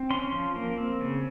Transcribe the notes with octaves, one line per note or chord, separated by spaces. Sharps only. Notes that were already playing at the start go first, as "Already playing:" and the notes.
Already playing: C4
C#4 C6
F3
A#3
C4
C#3